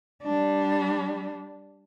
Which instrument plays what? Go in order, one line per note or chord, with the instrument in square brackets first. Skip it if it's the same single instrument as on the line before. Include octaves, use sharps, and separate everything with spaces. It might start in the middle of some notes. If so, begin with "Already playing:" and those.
[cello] G3 D4